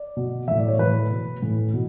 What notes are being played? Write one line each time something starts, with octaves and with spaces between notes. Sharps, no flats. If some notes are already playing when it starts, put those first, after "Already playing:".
Already playing: D5
B2
A2 E3 E5
D5
C#5
A2 E3 B4
B2
A2 E3
B2